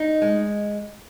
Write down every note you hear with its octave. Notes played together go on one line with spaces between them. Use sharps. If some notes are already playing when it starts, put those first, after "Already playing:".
Already playing: D#4
G#3